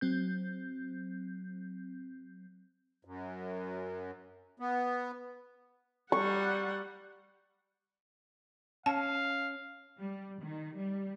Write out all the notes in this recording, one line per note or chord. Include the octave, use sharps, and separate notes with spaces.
F#3 C4 G6
F#2
B3
G3 F#5 C#6
C#4 F5 A5
G3
D#3
G3